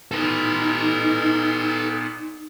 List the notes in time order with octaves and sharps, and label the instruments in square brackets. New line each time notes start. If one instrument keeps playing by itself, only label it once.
[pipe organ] A#2 B3 [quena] D#4 [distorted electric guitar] A4 B4